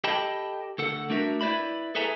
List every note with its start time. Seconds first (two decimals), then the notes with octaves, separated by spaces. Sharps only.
0.04 G4 A4 D#5 G5 A5 B5
0.78 D2 A4 F#5
1.10 A3 D4 F#4 A#4 E5
1.41 E4 B4 C5 D5 E5 B5
1.95 G#4 A4 B4 E5 G#5 A#5